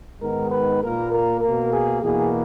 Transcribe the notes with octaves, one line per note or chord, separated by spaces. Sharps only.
G#2 D#3 G#3 B3 A#4
B4
A#2 A#3 A#4
A#4
B2 A#3 A#4
G#4
E2 B2 A#3 G#4